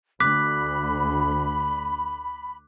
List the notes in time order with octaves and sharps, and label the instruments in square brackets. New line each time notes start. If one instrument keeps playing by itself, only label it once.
[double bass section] D2 [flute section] B5 [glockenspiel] D6 F#6 B6